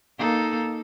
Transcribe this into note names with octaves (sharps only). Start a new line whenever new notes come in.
A#3 D#4 A4